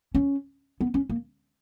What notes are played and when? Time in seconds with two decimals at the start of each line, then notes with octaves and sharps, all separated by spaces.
0.15 C#4
0.81 B3
0.94 C#4
1.10 A#3